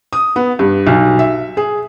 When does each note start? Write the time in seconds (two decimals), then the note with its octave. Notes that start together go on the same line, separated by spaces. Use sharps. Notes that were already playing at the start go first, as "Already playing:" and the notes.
0.13 D#6
0.36 B3
0.59 G2
0.87 B1
1.19 E5
1.57 G#4